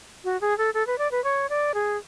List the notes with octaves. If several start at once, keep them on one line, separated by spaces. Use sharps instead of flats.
F#4
G#4
A4
A4
B4
D5
B4
C#5
D5
G#4